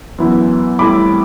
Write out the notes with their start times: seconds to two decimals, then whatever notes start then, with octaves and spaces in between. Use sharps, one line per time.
0.18 F#2 E3 B3 E4
0.79 A2 G3 C4 E4 B5 D6